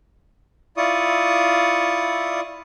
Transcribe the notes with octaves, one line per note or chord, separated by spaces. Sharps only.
E4 F4 D5 C#6 D#6